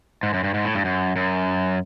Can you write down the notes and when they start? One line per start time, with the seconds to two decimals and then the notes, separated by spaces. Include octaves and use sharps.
0.23 G#2
0.34 F#2
0.44 G2
0.54 G#2
0.64 A2
0.74 G2
0.85 F#2
1.16 F#2